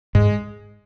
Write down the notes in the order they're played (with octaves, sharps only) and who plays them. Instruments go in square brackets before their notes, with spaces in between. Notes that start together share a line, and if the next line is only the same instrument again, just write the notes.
[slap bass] G#2 [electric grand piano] G#3